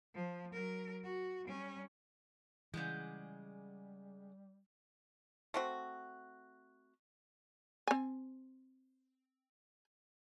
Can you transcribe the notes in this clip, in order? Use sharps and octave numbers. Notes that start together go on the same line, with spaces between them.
F3
F#3 A#4
F#4
G3 C#4
C#3 E3 G3 G#3 D5 F#5 G6
A3 C4 F#4
C4 G#5